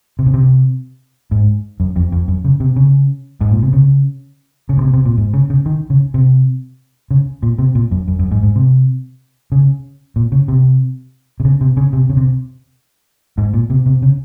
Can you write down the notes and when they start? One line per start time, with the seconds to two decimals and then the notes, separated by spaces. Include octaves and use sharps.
0.19 C3
0.26 C#3
0.34 C3
1.31 G#2
1.80 F#2
1.96 F2
2.12 F2
2.28 F#2
2.45 C#3
2.60 C3
2.76 C#3
3.41 G#2
3.51 A#2
3.63 C3
3.73 C#3
4.69 C#3
4.77 A#2
4.81 C3
4.94 C3
5.05 A#2
5.18 G#2
5.34 C#3
5.50 C#3
5.66 D#3
5.90 C#3
6.14 C3
7.11 C#3
7.43 A#2
7.58 C3
7.75 A#2
7.91 F#2
8.08 F#2
8.19 F#2
8.31 G#2
8.43 G#2
8.56 C3
9.52 C#3
10.16 A#2
10.32 C#3
10.48 C3
11.40 C3
11.45 C#3
11.61 C3
11.77 C#3
11.93 C3
12.10 C#3
12.17 C3
13.38 G#2
13.54 A#2
13.70 C3
13.86 C3
14.02 C#3